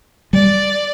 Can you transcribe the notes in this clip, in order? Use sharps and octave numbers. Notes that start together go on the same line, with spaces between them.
G3 D5